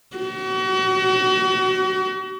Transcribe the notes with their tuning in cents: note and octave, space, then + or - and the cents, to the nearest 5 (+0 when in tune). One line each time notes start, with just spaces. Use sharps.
F#4 +40